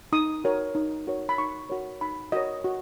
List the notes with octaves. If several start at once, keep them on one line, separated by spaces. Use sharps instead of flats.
D#4 D#6
F#4 A#4 C#5
D#4
F#4 A#4 C#5
B5
D#4 C#6
F#4 A#4 C#5
D#4 B5
F#4 A#4 C#5 D#5
F#4